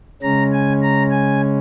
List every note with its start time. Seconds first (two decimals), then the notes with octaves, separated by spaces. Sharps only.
0.22 C#3 G#3 C#4 A#5
0.52 G#5
0.82 A#5
1.10 G#5